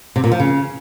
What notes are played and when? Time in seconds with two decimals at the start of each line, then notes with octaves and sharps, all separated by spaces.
0.16 C3
0.24 A#2
0.32 F3
0.40 C#3